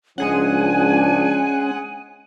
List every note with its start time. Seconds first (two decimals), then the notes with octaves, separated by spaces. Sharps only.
0.18 C#2 F3 G#3 C#4 D4 G#4 F#5 G#5